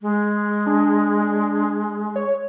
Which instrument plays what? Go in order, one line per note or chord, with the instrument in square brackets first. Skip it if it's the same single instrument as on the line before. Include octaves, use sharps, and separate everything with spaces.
[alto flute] G#3
[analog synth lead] D4
C#5